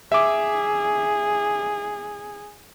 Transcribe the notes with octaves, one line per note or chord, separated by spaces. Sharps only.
G#4 E5 D6